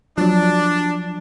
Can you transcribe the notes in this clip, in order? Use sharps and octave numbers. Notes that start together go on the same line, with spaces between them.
F3 F#3 D4